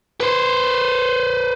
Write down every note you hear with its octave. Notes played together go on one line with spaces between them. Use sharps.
B4 C5